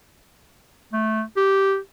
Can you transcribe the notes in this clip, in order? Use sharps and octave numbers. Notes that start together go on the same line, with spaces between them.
A3
G4